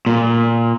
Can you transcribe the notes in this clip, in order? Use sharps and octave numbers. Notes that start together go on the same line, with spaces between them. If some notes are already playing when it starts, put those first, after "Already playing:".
A#2